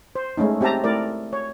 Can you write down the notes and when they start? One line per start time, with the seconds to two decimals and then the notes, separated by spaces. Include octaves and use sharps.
0.15 C5
0.37 G#3 A3 C#4 D#4
0.61 C4 G4 E5 A5 A#5
0.84 A3 E4 A#4 D5
1.33 C#5